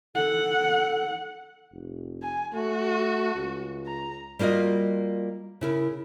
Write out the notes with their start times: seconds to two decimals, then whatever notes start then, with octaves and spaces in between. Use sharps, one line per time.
0.15 A4 F#5
1.72 F1
2.23 G#5
2.54 A3 F#4
3.35 C#2
3.87 A#5
4.39 G3 A#3 F4 F#4 D#5
5.61 C#3 E4 A#4